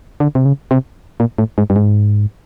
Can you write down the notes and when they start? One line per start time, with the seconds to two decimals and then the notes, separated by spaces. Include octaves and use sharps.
0.20 D3
0.35 C3
0.45 C#3
0.71 C3
1.20 A#2
1.38 A2
1.58 G#2
1.70 G2
1.76 G#2